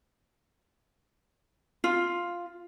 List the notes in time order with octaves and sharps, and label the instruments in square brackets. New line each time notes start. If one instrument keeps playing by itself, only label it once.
[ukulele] F4